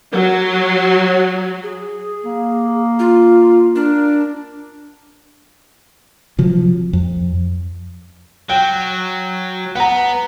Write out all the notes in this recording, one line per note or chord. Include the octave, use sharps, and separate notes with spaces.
F#3
G#4
A#3
F4
D4 A#4
C3 F3 F#3
F2
F#3 G5
B3 F#5 A#5